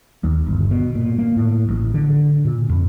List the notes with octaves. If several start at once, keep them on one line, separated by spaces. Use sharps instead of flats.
D#2
G1
B2
A#2
A#3
A2
A1
D3
A#2
F2